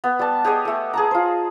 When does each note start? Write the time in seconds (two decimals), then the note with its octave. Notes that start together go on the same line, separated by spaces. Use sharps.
0.04 B3
0.19 G3 A5
0.44 G4 G#4 C#5 D#5
0.65 A3 A4
0.94 G#4 A5 A#5
1.11 F4 C5